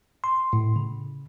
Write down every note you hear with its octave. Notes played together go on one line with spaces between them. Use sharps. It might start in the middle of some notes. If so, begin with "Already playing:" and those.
C6
A2
C#3